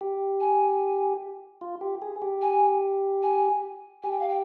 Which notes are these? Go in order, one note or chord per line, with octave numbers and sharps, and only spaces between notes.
G4
G#5
F4
G4
G#4
G4
G#5
G#5
G4 G#5
G5
F5
G5